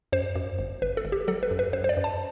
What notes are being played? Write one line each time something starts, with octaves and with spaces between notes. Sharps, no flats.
F#2 C5
F#2
G1
G1 B4
A4
G1
G4
F#3 A4
B4
F#2
B4
F#2 C5
C5
D5
F#2
A5